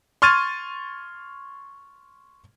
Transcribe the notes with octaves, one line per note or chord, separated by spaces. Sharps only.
C6 C#6 F6 G#6 A6 D#7